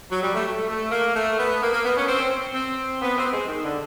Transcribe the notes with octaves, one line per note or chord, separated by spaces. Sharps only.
F#3
G3
A3
A3
A3
A#3
A3
B3
A#3
A#3
B3
C#4
C4
C4
B3
C4
G#3
D#3
D3